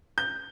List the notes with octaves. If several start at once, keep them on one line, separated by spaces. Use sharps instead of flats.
G6